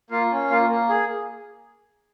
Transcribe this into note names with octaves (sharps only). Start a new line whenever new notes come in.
A#3 F4 F5
C#4
A#3 F4 F5
A#3
G#4